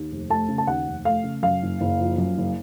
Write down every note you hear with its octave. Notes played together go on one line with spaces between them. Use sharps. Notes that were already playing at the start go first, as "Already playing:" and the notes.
Already playing: D#2
F1
A3 A5
C#3
A5
D#2 F#5
F1
A3 F5
C#3
F#2 F5
F#1
F#1
F3
F#2
F#1